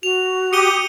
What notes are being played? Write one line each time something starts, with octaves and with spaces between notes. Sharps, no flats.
F#4 F7
G4 D#6 C#7 D#7 G7